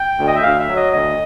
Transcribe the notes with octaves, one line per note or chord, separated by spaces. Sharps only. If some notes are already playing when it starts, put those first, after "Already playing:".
Already playing: G5
D2
D#5
E5
D2 F5
E5
F#3
D#5
D2 D#5